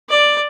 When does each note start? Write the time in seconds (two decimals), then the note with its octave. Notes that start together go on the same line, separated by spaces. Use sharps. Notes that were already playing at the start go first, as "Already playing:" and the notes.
0.09 D5